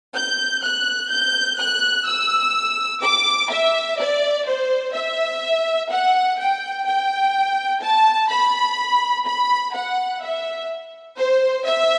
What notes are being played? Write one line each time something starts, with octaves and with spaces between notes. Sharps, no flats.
G6
F#6
G6
F#6
E6
D6
E5
D5
C5
E5
F#5
G5
G5
A5
B5
B5
F#5
E5
C5
E5